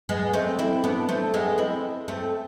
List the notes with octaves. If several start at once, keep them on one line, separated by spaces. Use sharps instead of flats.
G#3 B3
A3 C4
C4 E4
B3 D4
A3 C4
G#3 B3
C4 E4
A3 C4